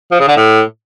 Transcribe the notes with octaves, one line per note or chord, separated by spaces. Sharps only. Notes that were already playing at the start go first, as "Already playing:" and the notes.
F3
C#3
D3
A2